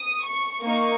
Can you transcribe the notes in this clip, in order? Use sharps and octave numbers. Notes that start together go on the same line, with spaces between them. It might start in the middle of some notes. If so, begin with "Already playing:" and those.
Already playing: D#6
C#6
A#3 D#4 C#6